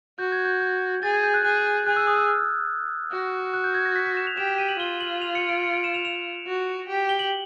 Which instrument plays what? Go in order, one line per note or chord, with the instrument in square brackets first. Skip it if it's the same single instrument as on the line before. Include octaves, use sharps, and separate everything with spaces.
[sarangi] F#4 [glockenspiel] G6
[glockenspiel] G#6
G6
G6
[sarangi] G#4 [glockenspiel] A6
[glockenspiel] G#6
G6
F#6
[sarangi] G#4 [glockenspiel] F#6
[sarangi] G#4 [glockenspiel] F#6
[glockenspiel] E6
D#6
E6
F6
[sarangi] F#4
[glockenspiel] F#6
G6
G#6
A#6
B6
B6
E7
F7
[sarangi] G4 [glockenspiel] E7
[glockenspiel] E7
D#7
F#7
[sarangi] F4 [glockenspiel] G7
[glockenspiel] F#7
F7
C#7
D7
C#7
D7
E7
F7
F7
[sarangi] F#4
G4
[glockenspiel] G7
F#7